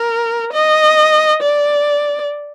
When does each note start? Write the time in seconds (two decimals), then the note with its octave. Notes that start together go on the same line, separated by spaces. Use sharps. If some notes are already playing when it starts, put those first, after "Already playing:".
Already playing: A#4
0.53 D#5
1.42 D5